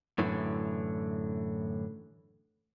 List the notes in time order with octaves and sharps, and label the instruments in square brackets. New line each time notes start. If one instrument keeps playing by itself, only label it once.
[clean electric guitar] F#2 A2 D3 E3